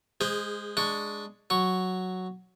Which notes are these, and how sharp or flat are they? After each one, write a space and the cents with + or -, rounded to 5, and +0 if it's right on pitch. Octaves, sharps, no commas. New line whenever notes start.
G#3 +0 G#4 -25 C5 -5
G#3 +0 D4 +0 C#6 +5
F#3 +0 C#6 +0